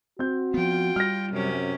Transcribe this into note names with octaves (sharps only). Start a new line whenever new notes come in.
C4 F#4 G6
F3 B3 F4 G5
G3 F6 A#6
F#2 C3 C#4